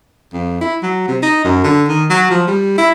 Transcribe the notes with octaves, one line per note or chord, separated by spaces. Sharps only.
F2
E4
F#3
C3
D#4
F#2
D3
D#3
F#3
F3
G3
E4